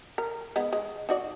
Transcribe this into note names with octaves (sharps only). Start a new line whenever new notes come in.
A#4
G#3 B3 D#4
G#3
D#4 F#4 D5